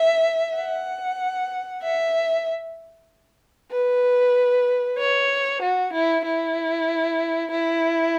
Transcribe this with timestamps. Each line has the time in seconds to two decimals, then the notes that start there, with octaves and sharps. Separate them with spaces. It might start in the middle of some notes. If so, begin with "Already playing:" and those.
Already playing: E5
0.56 F#5
1.83 E5
3.72 B4
4.99 C#5
5.62 F#4
5.93 E4
6.24 E4
7.51 E4